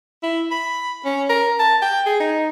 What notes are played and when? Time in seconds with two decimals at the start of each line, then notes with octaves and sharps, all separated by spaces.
0.23 E4
0.51 B5
1.05 C#4
1.30 A#4
1.59 A5
1.82 G5
2.06 G#4
2.20 D#4